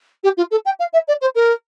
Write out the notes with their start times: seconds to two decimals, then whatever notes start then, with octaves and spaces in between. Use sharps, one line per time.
0.23 G4
0.37 F4
0.51 A4
0.65 G5
0.79 F5
0.93 E5
1.08 D5
1.21 C5
1.35 A#4